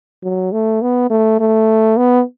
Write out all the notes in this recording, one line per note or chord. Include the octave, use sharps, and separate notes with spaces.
F#3
A3
B3
A3
A3
B3